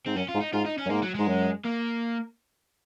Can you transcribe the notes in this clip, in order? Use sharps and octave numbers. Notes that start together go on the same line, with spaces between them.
G#2 C4
F#2 C#4
F4
G#2
D#4
G#2 F4
D#4
C#4
F#2
G#2 A#3
F#3
G#2 G#3
F#2
A#3